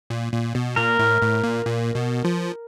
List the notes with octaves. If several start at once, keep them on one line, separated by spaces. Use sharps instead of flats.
A#2
A#2
B2
A#2 A#4
A2
A2
A#2
A#2
B2
F3